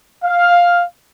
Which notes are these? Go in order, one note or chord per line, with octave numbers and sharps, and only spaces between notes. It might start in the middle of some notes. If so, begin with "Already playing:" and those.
F5